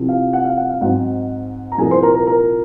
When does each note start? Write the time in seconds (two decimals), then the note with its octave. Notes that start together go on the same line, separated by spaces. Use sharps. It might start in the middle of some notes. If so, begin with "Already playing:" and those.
Already playing: C2 C3 F3
0.09 F5
0.33 F#5
0.44 F5
0.57 F#5
0.69 F5
0.81 G#2 F#3 C4 D#4 F#5
1.72 A#5
1.78 C2 A#2 F3 G#4 G#5
1.91 C5 C6
2.03 A#4 A#5
2.15 A#4 A#5
2.27 A#4 A#5